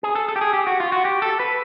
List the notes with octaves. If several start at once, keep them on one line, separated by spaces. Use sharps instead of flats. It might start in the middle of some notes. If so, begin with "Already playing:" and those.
G#4
A4
A4
G4
G#4
G4
F#4
F4
F#4
G4
A4
B4